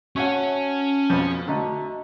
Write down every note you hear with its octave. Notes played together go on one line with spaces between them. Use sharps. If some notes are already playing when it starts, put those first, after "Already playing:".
C#4 F#4 C#5 E5 F#5 A5 C#6
F2 B2 C5 B5
D3 A3 F#4 D#5 A#5